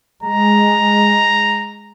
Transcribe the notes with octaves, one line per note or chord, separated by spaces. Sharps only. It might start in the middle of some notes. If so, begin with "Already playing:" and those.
G#3 A#5